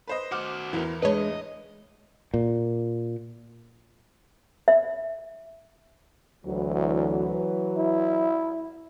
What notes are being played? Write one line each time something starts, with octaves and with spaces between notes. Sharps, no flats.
B4 C5 D#5
F#4 C5 D6 F6
E2 E3 E4 A#4
G#3 D4 B4 C#5 D#5
A#2
E5
D2 E3 F#3
E4